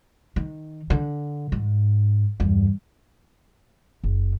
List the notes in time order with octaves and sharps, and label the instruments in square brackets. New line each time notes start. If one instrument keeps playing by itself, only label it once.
[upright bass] D#3
D3
G#2
E2 G2
F#1